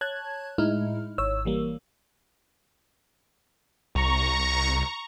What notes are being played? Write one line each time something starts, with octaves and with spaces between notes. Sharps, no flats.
C#5 A5 F#6 G#6
A2 G#3 D#4 E4 F6
G#1 C#5 E6
E3 G3 A#3
C2 A#5 C#6